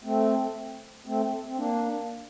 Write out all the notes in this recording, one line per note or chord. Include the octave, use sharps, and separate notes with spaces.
A3 C4
A3 C4
C4
A#3 D4